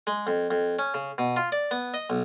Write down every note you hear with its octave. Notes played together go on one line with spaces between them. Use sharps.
G#3
F2
F2
C#4
C#3
B2
F4
D5
B3
D#5
B1